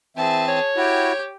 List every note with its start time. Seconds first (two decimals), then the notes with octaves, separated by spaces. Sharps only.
0.17 E3 C4 G#4 E5 A5
0.48 C#5
0.76 E4 F#4 G4 G5